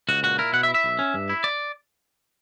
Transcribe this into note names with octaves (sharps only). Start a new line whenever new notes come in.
C#2 F#4
A#2 F#4
E4 A#4
B2 F#5
E5
E4
E5
B1
C#4
G2
E4
D5